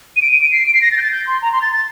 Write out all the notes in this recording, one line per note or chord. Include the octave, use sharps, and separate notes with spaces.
D#7
D7
D#7
D7
C7
D7
C7
A#6
A6
G6
A6
G6
C6
A#5
C6
A6
A6